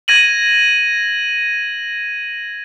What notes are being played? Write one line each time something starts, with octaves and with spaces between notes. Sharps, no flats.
G#6 A#6 D#7 F#7